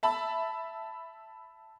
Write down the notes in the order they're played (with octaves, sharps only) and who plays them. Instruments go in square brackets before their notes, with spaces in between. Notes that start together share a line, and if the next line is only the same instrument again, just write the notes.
[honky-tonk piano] E5 A5 B5